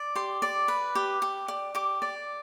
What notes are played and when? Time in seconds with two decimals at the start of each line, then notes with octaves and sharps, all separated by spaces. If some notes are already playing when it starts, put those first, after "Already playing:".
Already playing: D5
0.15 G4 C6
0.42 D5
0.68 B4
0.95 G4
1.22 G4
1.48 D5
1.75 G4 D6
2.02 D5